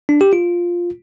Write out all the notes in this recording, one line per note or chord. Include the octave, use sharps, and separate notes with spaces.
D4
G4
F4